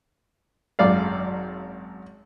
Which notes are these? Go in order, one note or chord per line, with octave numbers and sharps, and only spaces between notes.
G#1 F#2 D5 F5